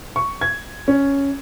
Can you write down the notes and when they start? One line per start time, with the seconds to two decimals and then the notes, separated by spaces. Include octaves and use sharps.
0.16 C#6
0.41 G#6
0.88 C#4